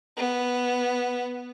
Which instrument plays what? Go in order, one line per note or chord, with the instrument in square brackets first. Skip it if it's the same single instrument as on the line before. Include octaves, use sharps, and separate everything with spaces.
[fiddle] B3